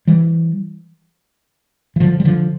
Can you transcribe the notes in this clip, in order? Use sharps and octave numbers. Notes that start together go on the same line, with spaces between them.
E3 G3
E3
D3 F3
G3
D3 F3